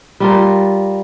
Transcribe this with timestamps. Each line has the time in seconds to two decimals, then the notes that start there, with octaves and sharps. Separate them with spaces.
0.20 G3 F4 A#4